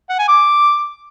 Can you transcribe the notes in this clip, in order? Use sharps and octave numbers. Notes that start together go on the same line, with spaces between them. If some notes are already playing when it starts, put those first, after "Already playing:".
F#5
G#5
D6